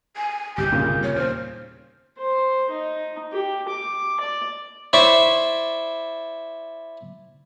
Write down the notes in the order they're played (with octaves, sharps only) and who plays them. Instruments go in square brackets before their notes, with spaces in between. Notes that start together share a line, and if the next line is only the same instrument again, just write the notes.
[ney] G#5
[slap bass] G1 C2 G#2 [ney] G4 [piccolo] G6
[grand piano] A#2 C#3
[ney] C#5
[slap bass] D#2 [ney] C5 [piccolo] F6
[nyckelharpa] C5
D#4
G4
D6
D5
[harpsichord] E4 C5 D5 B5 C#6